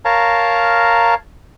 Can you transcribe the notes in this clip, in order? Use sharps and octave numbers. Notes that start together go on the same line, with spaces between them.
A#4 C#5 F5 A5 A#5